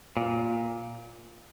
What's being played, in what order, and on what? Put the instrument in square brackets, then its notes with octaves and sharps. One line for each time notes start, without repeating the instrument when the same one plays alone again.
[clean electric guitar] A#2